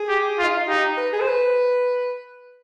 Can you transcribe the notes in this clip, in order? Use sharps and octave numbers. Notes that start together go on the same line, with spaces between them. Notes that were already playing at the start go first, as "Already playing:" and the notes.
Already playing: G#4
G4
F4
D#4
F4
D#4 G4
B4
G#4
C5
B4